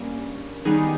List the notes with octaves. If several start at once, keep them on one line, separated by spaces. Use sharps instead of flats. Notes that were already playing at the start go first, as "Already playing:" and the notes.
Already playing: G2 G3 A#3 C#4
D#3 G3 B3 D#4 G#4